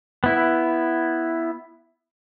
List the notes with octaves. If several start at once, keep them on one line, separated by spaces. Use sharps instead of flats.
B3 E4